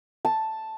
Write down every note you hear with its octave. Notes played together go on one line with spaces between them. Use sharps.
A5